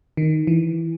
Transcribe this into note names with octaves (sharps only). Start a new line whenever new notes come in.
D#3
E3